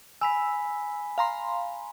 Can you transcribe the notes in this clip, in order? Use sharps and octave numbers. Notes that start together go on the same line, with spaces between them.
G#5 B5 E6 B6
F5 A#5 C6